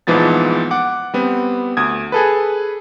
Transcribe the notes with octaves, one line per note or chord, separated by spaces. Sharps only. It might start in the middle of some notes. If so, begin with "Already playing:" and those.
A#1 G#2 E3 F3 B3 A6
F#5 D6
G3 B3 C4
D2 D#6 G#6
G#4 A4 B4